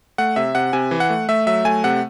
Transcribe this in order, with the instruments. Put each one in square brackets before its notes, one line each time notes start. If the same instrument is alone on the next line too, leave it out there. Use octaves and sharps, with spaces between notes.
[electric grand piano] A3 F#5
C3 E5
C3 F#5
C3 G#5
E3
F#5
A3
A3 E5
F#3 E5
A3 G#5
C3 F#5